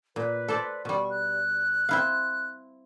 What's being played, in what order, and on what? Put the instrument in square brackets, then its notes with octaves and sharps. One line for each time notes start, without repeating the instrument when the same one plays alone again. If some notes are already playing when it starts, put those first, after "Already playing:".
[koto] A#2 [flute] B4
[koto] A4 C5 D5
[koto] B2 G3 [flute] C#6
[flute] F#6
[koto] C4 E4 F5